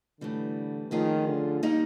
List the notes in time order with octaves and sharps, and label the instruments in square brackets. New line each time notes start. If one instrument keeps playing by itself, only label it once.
[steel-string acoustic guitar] A2 E3 G3 [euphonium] D3
[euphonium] D#3 [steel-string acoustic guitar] F3 A3 C#4 F4 G#4
[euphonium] D3
[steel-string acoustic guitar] D#3 G3 A#3 D#4